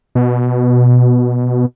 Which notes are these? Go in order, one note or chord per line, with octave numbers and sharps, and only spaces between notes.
B2